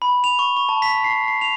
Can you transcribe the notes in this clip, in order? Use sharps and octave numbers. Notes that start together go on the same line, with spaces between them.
B5
F7
C#6
C#6
A5
B6
C7
C7
F7